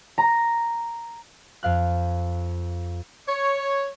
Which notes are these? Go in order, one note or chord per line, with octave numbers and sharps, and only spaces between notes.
A#5
F2 F5 F#6
C#5